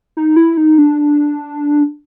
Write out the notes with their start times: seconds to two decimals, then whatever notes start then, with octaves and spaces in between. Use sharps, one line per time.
0.17 D#4
0.36 E4
0.57 D#4
0.78 D4